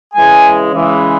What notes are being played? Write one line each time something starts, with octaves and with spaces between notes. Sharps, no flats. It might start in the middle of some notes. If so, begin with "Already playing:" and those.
C#3 E3 G#3 G#5
C#3 E3 G#3